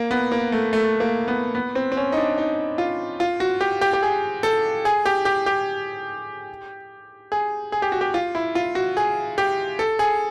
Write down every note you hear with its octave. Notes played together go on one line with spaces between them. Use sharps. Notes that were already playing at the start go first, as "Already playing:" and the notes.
Already playing: A#3
B3
A#3
A3
A3
A#3
B3
B3
C4
C4
C#4
D#4
D4
D#4
F4
F4
F#4
G4
G4
G4
G#4
A4
G#4
G4
G4
G4
G#4
G#4
G4
F#4
G4
F4
E4
F4
F#4
G#4
G4
A4
G#4